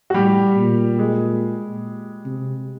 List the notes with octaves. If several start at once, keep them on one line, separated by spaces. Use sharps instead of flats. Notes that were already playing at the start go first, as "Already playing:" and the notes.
F#4
A2 G3 G4
A#2
G#3 G#4
C3